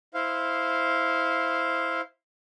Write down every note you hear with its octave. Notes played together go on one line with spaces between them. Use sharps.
E4 C5 F5